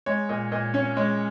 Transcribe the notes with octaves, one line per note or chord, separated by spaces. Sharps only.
G#3 C#5
A#2 D#5
A#2 D#5
C#4 C#5
G#3 C#5